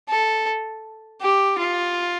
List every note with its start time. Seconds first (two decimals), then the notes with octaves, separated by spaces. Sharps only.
0.09 A4
1.21 G4
1.59 F4